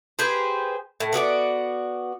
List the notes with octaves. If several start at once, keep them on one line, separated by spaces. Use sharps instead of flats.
G4 G#4 B4 C5
A2
B3 F#4 G4 D5